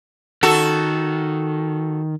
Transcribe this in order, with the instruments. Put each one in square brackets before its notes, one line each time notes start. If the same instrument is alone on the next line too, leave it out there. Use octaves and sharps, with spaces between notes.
[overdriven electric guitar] D#3 [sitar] F#4 A4